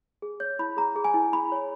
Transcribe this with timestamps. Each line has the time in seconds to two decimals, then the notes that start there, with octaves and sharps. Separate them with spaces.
0.22 G#4
0.40 C#5 G6
0.59 E4 B5
0.77 G#4 A#5
0.96 G#4
1.04 G#5
1.14 E4
1.32 E4 B5
1.52 C#5